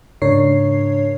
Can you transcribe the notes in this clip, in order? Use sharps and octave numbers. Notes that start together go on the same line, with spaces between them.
G#2 C#3 D4 A#4 C#5 C7